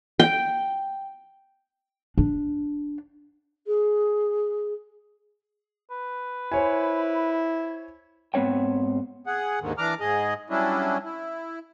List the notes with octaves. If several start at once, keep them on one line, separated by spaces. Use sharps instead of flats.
G5
D4
G#4
B4
E4 C5 C#5 G#5
G#2 B3 C4 C#5 G5
G#4 F#5
D#2 G#2 D3 D#3
E3 D4 A#5 D6 F6
G#2 G#4 D#5
F#3 G3 C#4 D4 E4
E4